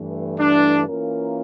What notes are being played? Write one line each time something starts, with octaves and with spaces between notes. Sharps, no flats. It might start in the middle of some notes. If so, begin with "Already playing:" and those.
Already playing: G2 E3 A3
D4
E3 A#3 C#4 F4 A#4